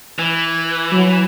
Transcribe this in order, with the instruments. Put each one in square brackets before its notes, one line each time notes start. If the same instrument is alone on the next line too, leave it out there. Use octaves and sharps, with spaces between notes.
[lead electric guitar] E3
[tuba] F#3